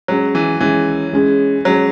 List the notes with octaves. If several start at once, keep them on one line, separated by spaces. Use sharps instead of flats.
F#3 G#3 C#4 G#4
E3
E3 G#3 C#4 G#4
G#3 C#4 G#4
F#3 G#3 C#4 G#4